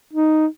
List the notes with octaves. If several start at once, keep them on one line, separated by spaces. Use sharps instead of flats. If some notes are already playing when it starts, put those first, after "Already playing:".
D#4